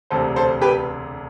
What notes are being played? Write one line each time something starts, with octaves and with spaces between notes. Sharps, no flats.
E1 D2 C3 A4 C5
A4 C5
G4 B4